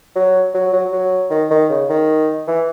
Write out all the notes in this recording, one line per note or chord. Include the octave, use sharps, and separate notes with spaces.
F#3
F#3
F#3
F#3
D#3
D#3
C#3
D#3
E3